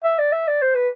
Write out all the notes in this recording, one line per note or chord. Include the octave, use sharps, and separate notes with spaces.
E5
D5
E5
D5
C5
B4